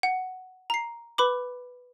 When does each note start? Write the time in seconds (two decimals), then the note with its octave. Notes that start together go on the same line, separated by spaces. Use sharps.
0.03 F#5
0.70 A#5 C7
1.18 B4 B5 D6